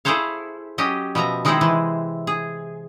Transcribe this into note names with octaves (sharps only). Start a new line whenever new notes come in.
E4 G#4 A4 C5 C#5 F5
F#3 C#4 G4 D#5
B2 F3 E5 A#5
D#3 G#3 C4 D#4 E4 G#4
C3 E3 F#5
G#4